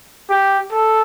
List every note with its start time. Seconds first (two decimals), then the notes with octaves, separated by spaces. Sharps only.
0.29 G4
0.72 A4